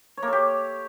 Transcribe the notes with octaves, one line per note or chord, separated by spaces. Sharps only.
C#5
A#3
A4
G4